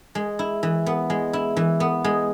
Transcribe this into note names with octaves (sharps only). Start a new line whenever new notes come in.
G#3
E4
E3
B3
G#3
E4
E3
B3
G#3